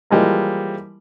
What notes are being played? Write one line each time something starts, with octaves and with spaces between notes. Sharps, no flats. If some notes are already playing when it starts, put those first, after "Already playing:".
E3 F3 G3 G#3 A#3